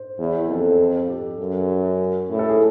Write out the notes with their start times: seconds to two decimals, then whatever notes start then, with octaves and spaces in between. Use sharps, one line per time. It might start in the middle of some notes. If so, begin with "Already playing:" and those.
Already playing: C5
0.19 E2
0.50 F2 A4
1.09 G4
1.40 F#2
2.30 A2
2.39 A4
2.49 G#4